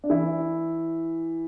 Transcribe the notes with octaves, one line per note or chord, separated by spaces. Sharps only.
D4
E3 E4